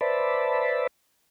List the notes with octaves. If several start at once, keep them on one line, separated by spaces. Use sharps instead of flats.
B4 C5 D5 E5 A5 B5